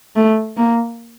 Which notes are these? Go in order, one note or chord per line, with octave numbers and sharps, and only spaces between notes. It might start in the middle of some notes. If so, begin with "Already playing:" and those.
A3
A#3